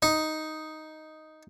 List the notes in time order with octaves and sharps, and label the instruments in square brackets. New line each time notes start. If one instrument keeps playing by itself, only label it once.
[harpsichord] D#4